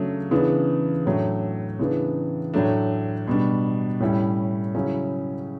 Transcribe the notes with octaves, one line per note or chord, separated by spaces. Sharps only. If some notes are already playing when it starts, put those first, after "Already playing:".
Already playing: C#3 F#3 A3 D4
C#3 E3 B3 D4
A2 F#3 A3 D4
C#3 E3 B3 D4
A2 F#3 A3 D4
B2 G3 D4
A2 G3 C#4 E4
C#3 F#3 C#4 E4